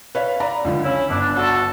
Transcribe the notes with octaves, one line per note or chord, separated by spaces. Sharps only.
B4 C#5 F5
D5 A#5 B5
C#2 D3 F3
C#3 C#4 E4
G1 D4
F#4 A4